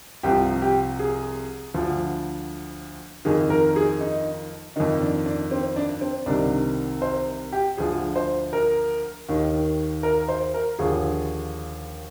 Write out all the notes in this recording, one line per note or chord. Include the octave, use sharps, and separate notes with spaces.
C2 C3 F3 G4
G4
G#4
D2 D3 F3
F2 D#3 G#4
A#4
G#4
D#4
F2 D#3 D#4
D4
D4
C4
D4
C4
C2 C3 D#3 D4
C5
G4
D2 D3 F3 G#4
C5
A#4
D#2 D#3
A#4
C5
A#4
D#2 D3 F3 G#4